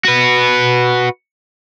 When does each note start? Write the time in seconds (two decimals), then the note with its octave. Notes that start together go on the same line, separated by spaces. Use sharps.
0.04 F#4 B4